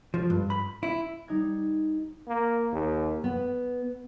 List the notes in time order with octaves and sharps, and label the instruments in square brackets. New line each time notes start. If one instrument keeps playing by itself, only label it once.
[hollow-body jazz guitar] F3
G2
B5
E4
[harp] G3 D#4 G#6
[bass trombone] A#3
D#2
[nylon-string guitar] B3